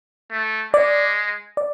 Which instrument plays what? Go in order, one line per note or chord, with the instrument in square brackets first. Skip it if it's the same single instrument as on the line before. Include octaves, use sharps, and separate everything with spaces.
[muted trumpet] A3
[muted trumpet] G#3 [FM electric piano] D5
[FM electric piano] D5